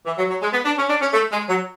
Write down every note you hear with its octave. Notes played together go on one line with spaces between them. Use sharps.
E3
F#3
F#3
G#3
B3
D4
C#4
D4
C#4
A3
G#3
F#3